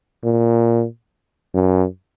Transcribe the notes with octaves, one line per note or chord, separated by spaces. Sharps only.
A#2
F#2